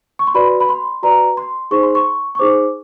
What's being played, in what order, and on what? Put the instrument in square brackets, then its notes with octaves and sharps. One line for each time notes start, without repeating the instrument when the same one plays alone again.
[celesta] C#6
C6
F#4 B4 D5 B5
B5
C6
F#4 B4 D5 A#5
C6
D#4 G#4 C5 C#6
C6
C#6
C#6
D#4 G#4 C5 D6